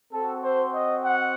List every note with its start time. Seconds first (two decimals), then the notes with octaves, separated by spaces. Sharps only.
0.13 C4 F#4 A4
0.44 C5
0.74 D#5
1.05 F#5